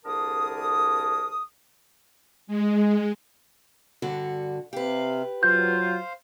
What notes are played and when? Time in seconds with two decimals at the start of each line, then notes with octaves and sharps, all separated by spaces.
0.06 C2 D3 G#4 A#4 A5 D#6
2.47 G#3
4.02 G2 D3 F#4
4.73 C3 G4 B4 F5
5.43 F#3 F4 C5 F5 G6